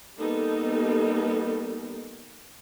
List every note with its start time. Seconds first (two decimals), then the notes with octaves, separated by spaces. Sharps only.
0.20 G3 A#3 B3 D#4 A4